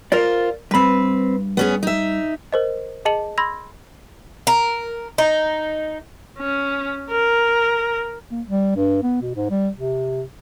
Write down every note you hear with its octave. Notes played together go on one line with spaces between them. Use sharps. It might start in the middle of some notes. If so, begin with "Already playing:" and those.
F4 A#4 C5 D5
G2 C4 B4 B5
B3 C#4 G#4
D#4 E5
A#4 C5 D#5
G#4 D#5 A5 C#7 F#7
B5 C6 E6 G#6 A#6
A#4
D#4
C#4
A#4
A#3
G3
G2
B3
B2
G#2
G3
C3